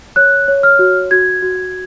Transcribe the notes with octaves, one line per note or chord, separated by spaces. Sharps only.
C#5 F#6
C#5
F6
F#4
F#4 G#6
F#4